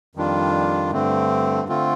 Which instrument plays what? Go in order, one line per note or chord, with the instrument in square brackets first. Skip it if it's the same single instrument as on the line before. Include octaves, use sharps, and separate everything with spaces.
[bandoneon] F2 D#3 G3 D4 F4
G2 D3 A3 C4
D3 A3 C4 F4